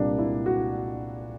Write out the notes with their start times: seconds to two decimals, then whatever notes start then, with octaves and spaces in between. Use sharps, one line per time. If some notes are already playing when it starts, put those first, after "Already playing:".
Already playing: C2 A#2 G3 A#3 D4
0.18 E4
0.46 F#4